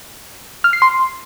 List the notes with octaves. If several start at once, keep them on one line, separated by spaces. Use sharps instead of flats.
F6
C7
C6